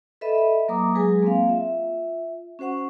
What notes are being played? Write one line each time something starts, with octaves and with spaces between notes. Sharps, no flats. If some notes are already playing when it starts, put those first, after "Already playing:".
A4 B4 D#5 E5 B5
F#3 A#3 B4 A#5 D6 D#6
F#3 G#3 G#4 B4 G#5
A#3 C4 F5
F4 E5
C#4 F#4 C5 F#5 C#6